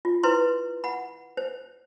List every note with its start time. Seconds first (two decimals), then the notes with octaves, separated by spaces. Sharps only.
0.05 F4
0.23 E4 B4 C5 C6
0.84 F#5 B5
1.37 C5